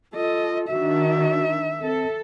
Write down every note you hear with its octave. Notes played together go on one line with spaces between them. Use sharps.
F4 A4 D#5
D#3 D4 F#4 E5
C4 A4